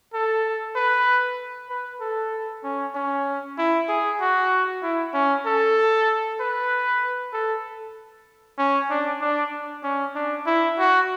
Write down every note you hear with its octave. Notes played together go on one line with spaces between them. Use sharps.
A4
B4
B4
A4
C#4
C#4
E4
G#4
F#4
E4
C#4
A4
B4
A4
C#4
D4
D4
C#4
D4
E4
F#4